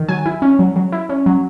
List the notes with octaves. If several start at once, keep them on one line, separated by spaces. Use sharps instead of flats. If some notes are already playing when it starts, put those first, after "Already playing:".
Already playing: D#3
F#3 G#5
E4
C#4
F#3
F#3
E4
C#4
F#3